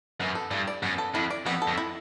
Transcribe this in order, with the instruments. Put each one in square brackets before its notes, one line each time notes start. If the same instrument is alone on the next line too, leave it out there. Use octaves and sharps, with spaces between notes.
[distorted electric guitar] F#2 [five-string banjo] B3
[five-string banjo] A4
[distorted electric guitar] G2 [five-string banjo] E4
[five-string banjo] D5
[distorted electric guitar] F#2 [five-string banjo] B3
[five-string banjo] A4
[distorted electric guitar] F2 [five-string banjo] E4
[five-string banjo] D5
[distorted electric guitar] F2 [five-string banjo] B3
[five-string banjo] A4
[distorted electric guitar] F2
[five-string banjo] E4